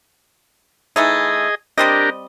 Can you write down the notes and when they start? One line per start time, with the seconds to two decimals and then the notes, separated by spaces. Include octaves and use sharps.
0.96 E3 A3 D#4 G#4 D#5
1.78 G3 C4 D4 G4 A#4 D#5